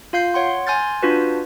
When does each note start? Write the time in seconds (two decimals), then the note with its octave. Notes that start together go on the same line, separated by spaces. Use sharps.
0.13 F4 F5 G6 C7
0.34 C#5 F#5 C6
0.67 G#5 C6 F6 G6 A6
1.03 D4 F4 F#4 B4